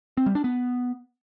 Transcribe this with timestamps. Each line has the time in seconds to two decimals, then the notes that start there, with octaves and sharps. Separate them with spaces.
0.17 C4
0.26 G3
0.35 D4
0.44 B3